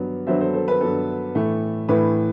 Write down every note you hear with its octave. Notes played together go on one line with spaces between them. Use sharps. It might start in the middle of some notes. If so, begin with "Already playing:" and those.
Already playing: G2 F#3 B3
G2 F#3 B3 C5 E5
A4 C5
A4 C5
B4
G2 F#3 B3 A4
A2 E3 A3
A2 E3 A3 B4